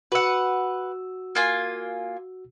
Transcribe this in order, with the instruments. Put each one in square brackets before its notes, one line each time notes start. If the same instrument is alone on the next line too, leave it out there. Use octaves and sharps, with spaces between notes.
[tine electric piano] F#4 E6 [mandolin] B4 F#5
[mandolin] A#3 F4 G#5